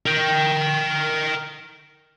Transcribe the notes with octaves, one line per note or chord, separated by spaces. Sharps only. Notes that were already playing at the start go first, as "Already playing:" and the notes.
A#4 G5